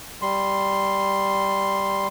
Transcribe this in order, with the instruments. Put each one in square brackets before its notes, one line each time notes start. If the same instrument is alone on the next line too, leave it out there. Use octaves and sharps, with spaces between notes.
[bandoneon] G3 C6